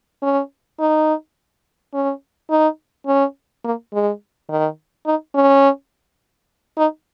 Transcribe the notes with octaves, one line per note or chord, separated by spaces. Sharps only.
C#4
D#4
C#4
D#4
C#4
A#3
G#3
D#3
D#4
C#4
D#4